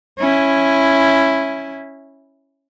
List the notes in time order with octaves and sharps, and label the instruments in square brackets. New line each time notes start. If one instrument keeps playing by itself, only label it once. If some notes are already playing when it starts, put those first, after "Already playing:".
[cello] C#4 E4